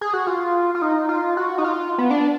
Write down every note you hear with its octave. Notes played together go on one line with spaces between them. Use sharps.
G#4
F#4
F4
F4
D#4
F4
F#4
D#4
F4
B3
D4